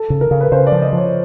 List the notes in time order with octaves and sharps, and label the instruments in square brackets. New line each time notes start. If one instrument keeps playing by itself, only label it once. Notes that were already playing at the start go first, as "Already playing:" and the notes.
Already playing: [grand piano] A4
[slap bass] C#3
[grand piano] A#4
[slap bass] C#3
[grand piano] B4
[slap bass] C#3 [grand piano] C5
[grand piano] D5
[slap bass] F3
[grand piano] D#5
[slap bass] F3 [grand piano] C#5